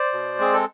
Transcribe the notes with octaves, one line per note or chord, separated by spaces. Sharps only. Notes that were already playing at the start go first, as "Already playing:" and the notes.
Already playing: C5 D5
B2
G#3 C4 G#4
A4